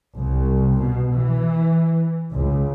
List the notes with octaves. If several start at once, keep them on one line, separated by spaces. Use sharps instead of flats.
C2
B2
E3
C#2